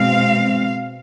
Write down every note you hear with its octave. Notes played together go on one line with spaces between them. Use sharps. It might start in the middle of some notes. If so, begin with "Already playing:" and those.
Already playing: B2 G#3 C4 F5